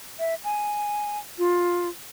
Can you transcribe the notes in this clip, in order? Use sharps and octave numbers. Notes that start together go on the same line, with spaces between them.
E5
G#5
F4